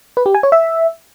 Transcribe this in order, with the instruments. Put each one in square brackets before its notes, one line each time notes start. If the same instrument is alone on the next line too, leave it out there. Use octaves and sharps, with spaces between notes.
[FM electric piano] B4
G4
G#5
C#5
E5